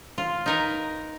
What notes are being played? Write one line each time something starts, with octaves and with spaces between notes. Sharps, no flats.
F4
D#4 A#4 B4